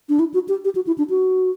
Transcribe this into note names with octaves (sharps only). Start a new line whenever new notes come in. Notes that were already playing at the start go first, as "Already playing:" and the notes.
D4
E4
F#4
G4
G4
F#4
E4
D4
F#4